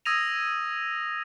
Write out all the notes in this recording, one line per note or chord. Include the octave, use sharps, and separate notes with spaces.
D#6 E6 G#6 A#6 D#7 F7